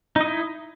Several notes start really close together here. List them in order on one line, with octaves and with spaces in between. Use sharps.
D#4 D#5 E4